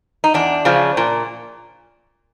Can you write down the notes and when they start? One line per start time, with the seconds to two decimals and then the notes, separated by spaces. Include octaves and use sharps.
0.24 D#4
0.34 E2 D4
0.65 C#3 F3
0.97 A#2